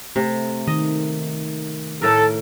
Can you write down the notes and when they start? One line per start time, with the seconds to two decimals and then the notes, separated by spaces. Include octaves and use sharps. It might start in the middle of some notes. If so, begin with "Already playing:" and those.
0.16 C3 A3
0.67 D#3 D#5
2.02 A2 A4 A#4